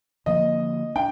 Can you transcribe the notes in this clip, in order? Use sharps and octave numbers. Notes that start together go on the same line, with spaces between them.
D3 F3 A#3 D#5
D4 G5